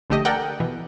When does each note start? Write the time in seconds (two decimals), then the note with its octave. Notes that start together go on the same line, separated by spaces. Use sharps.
0.10 A#1 D3 A3 G4 D#5
0.25 A4 A#4 D5 F#5 G5
0.60 B2 E3